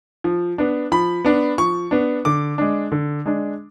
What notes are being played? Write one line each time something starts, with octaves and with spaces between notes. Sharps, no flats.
F3
B3 D4
F3 B5
B3 D4
F3 C#6
B3 D4
D3 D6
G#3 D4
D3
G#3 D4